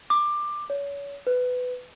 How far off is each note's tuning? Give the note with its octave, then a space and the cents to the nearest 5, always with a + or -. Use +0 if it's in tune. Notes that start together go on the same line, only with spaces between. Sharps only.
D6 +20
C#5 +30
B4 +15